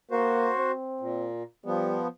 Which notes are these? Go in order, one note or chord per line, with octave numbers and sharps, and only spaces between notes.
A#3 F#4 C5
C4
A#2
F3 G3 B3